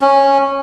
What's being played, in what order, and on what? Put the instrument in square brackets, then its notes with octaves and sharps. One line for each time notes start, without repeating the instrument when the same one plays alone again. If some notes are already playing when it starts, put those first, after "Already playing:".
[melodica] C#4